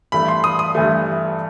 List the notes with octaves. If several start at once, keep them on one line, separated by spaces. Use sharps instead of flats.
G2 E3 A3 B5
C6
D#6
D#6
G2 E3 A3